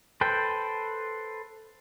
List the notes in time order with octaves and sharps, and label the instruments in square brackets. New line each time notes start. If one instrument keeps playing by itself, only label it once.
[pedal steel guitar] A4 B4 C5 G5